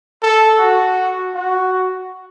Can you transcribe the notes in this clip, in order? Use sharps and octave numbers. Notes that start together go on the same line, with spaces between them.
A4
F#4
F#4